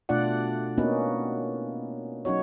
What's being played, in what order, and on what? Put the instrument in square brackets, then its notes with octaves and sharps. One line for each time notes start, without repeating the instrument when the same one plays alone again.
[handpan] B2 A3 D4 F4 D5 F#5
A#3 B3 C#4 D#4 F#4 B4
F#3 C#4 D#4 F#4 C#5